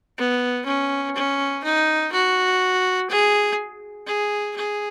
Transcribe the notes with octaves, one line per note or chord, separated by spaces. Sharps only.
B3
C#4
C#4
D#4
F#4
G#4
G#4
G#4